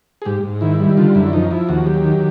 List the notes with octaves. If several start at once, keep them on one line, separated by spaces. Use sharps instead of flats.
G#4
G#2 G4
G#2
D#3 E4
G3
D3 F4
F#2 E4
F3 D#4
F3 E4
D#2 F#4
F#3 G4
D#3